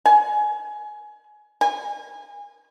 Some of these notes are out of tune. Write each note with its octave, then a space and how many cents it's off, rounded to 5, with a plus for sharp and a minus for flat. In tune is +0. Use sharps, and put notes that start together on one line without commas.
G#5 +20
G#5 -30